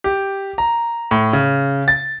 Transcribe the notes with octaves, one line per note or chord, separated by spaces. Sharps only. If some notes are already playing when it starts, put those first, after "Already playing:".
G4
A#5
A2
C#3
A6